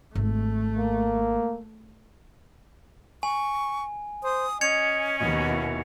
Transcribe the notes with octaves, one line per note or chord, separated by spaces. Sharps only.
G#1 A3
A#3
G#5 C#6
C5 D#6
C#4 D#5 G#6 C#7 F7
D#2 B2 D#5
E4